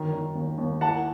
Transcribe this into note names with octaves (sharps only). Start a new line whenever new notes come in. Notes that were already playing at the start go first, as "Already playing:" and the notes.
Already playing: F#2 D#3
D#3
D#2
D#2
E3 F#5 A5